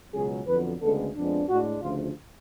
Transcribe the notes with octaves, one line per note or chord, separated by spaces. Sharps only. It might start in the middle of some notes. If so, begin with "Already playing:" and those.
C#2 B2 F#3 C#4 G#4
F2 D3 F#3 B3 B4
D2 C#3 G#3 B3 D4 A4
F2 F3 G#3 B3 D4
A2 G#3 D4 F#4
D2 C#3 F3 F4